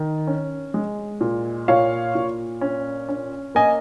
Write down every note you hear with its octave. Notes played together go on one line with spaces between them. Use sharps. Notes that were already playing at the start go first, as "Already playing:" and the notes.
Already playing: D#3
C#4
G#3
A#2
A#2 C#5 F5
A#2
C#4
C#4
A#3 D#5 G#5